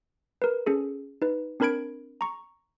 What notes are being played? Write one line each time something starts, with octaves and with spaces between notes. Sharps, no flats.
A#4 B4
C#4 G#4 A4
D#4 B4
C4 D4 A#4 B5 G#6 D7
A#5 C#6